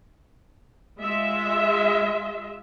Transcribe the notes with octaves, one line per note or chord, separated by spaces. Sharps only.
G#3 F4 E5